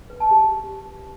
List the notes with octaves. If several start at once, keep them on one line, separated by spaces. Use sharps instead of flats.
B4
A5
G4